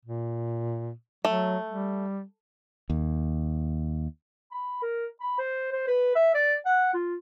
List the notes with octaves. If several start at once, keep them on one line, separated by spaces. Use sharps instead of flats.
A#2
F#3 A3
G3
D#2
B5
A#4
B5
C5
C5
B4
E5
D5
F#5
F4